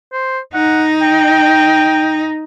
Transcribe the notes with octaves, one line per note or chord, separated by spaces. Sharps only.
C5
D#4 F#5
G5